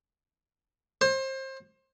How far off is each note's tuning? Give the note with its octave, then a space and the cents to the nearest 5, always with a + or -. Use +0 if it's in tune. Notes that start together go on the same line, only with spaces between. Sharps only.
C5 +30